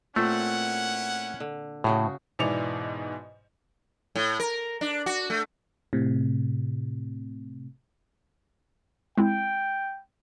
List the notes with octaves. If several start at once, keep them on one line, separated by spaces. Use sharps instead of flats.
A#2 A3 C4 C#4 E4 F#5
D3
A2 C#3 F#4 G#4
G#2 B2 E3 D5 C#7 F7
A2
A#4
D4
F#4
A3
A2 C3
G#3 C4 E4 G5